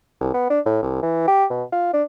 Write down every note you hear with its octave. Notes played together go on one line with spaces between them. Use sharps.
C2
B3
D4
A2
C2
E3
G4
B2
F4
D4